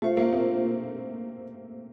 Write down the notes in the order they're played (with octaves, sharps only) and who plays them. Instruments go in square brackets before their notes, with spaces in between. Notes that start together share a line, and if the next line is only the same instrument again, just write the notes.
[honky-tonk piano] A3 [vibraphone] F4 C5 F5
[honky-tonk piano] A#3
C4